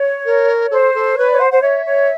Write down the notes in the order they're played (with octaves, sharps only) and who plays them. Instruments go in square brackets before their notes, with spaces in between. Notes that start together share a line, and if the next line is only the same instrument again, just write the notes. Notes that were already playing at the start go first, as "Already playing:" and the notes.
Already playing: [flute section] C#5
[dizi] A#4
[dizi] A4 [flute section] C5
[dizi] A4
[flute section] B4 [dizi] C#5
[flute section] C#5 [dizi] D5
[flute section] C5 [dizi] F#5
[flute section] C5 [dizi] F#5
[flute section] C#5 [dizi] E5
[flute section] C#5